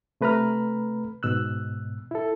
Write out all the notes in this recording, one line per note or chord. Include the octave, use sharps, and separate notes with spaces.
C3 A3 B4 A#5 B5 F6
G#2 B2 E6 F#6
E4 A4